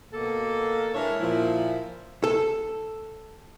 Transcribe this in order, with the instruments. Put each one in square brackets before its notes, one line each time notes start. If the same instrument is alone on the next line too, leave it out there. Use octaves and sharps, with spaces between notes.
[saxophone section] B2 A#3 A4
G#3 D4 E4 A#4 B4 C#5
A#2 F3 E4
[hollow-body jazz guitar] A4